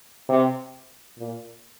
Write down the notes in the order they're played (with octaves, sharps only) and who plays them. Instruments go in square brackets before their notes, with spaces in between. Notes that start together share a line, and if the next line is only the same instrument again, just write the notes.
[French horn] C3
A#2